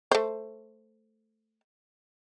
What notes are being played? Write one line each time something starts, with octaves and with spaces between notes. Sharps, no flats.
A3 C5